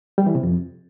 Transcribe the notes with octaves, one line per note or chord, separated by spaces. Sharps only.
G3
E3
C3
F2